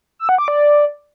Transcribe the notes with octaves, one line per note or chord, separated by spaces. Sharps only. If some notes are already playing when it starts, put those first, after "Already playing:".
E6
F#5
D6
D5